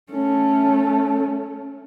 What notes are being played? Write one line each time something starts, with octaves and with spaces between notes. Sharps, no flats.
A3 C#4